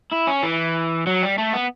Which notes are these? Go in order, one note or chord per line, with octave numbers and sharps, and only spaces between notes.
E4
C#4
E3
F#3
G3
A3
B3